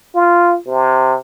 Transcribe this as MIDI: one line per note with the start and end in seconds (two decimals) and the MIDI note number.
0.15 0.56 65
0.67 1.16 48